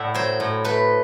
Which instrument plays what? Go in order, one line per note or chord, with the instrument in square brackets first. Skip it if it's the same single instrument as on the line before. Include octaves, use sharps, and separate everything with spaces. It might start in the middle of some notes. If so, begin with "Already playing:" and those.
Already playing: [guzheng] A2 A3 D5 E5 F#5
F#3 C5
A2
A3 B4